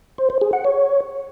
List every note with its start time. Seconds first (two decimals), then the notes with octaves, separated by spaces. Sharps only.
0.18 C5
0.30 C5
0.41 G#4
0.53 F#5
0.65 C#5